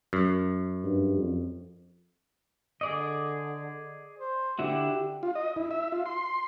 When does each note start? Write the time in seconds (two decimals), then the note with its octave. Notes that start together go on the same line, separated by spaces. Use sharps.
0.13 F#2
0.84 G2
1.18 F2
2.81 D3 G#4 D5 D#5
4.19 C5
4.59 D3 E4 F#4 G4
5.23 F4
5.35 D#5
5.56 E4
5.71 E5
5.92 F4
6.06 C6